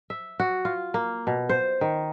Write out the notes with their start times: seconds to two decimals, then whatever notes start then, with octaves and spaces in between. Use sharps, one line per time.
0.10 E5
0.40 F#4
0.65 F4
0.94 A#3
1.27 B2
1.49 C5
1.81 D#3